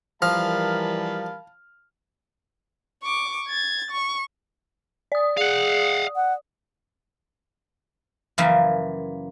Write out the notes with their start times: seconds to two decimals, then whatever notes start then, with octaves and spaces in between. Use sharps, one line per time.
0.22 E3 F3 G3 A#4 F5 A5 B5 F6
3.03 C#6 D6
3.48 G#6 A6
3.91 C#6
5.12 D5 D#6
5.37 G#4 F5 F#5
6.16 F#5
8.38 F#2 C#3 E3 F3 A#3